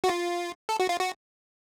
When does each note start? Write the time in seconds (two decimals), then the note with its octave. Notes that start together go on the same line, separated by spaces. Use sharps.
0.04 F#4
0.09 F4
0.69 A4
0.80 F#4
0.89 F4
1.00 F#4